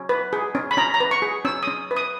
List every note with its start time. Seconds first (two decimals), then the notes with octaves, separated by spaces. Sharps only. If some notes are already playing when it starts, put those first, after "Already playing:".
Already playing: C#4
0.09 B4
0.33 G#4
0.55 C#4
0.71 B5
0.77 C#4 A#5
0.94 A#5
1.00 B4
1.11 C#6
1.22 G#4
1.45 C#4 E6
1.63 D#6
1.67 C#4
1.91 B4
1.96 D#6